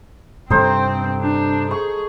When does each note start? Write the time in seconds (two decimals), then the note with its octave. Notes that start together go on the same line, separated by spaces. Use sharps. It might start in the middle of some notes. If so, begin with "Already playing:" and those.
0.50 G2 C3 C4 D#4 A4 C5
1.20 D4
1.71 G#4 C#6